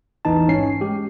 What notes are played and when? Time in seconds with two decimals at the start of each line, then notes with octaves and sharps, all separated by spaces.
0.25 A1 E2 E3 D#4 A5
0.48 G#2 C#4 C7
0.81 G#3 G4